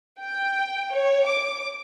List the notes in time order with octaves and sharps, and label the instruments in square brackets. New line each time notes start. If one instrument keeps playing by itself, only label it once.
[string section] G5
C#5
D6